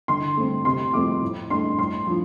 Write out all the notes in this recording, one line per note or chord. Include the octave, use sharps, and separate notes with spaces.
D3 C6
A3 C4
C3 C6
F3 A3 C4 D6
A2
A3 D4 C6
A2 C6
F3 D4